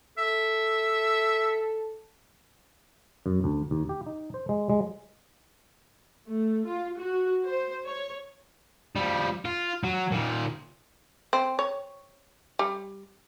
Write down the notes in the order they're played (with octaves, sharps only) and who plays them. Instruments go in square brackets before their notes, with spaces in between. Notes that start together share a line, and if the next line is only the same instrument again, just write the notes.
[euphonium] A4 [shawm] E5
[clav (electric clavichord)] F#2
D2
D#2
G4
D#4
C5
G#3
G#3
[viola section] A3
F4
F#4
C5
C#5
[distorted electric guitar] F3 G3
F4
F#3
A#2 D#3
[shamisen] C4
C#5
G3